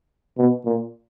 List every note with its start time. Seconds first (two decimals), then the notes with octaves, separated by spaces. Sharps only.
0.38 B2
0.65 A#2